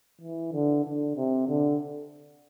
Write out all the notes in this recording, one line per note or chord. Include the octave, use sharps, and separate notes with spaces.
E3
D3
D3
C3
D3